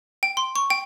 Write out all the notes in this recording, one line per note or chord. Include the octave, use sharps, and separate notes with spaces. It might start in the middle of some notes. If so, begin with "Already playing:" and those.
G5
C6
C#6
G5